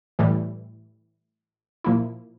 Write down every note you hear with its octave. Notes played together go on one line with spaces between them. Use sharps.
A2 E3 G3
A#2 F3 A#3 E4